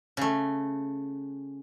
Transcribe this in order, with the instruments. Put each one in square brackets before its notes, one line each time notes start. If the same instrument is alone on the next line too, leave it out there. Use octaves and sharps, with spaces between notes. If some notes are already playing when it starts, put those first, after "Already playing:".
[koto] C#3 A3